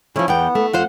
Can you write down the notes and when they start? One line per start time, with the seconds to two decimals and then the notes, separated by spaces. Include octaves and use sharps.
0.16 D3 F3 C#4 E4
0.28 E2 B3 G5
0.55 A3
0.73 F2 F4 C5 F#5